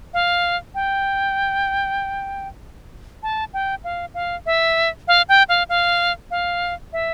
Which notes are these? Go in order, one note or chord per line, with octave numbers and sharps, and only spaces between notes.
F5
G5
A5
G5
F5
F5
E5
F5
G5
F5
F5
F5
E5